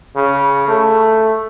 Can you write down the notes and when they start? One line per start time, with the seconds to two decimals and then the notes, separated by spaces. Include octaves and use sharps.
0.16 C#3
0.68 A3